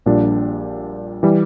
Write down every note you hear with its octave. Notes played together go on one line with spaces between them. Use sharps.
A#1 A#2 G3 D4
E3 G3